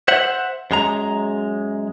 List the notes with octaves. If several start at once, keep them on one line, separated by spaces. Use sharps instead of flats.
C5 E5 F#5
F#2 G#3 A#5